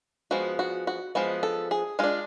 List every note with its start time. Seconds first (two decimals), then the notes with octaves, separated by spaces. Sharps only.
0.31 F3 G#3 B3 F#4
0.59 F#4
0.87 F#4
1.15 F3 G#3 B3 F#4
1.43 A4
1.71 G#4
1.99 G#3 D4 F4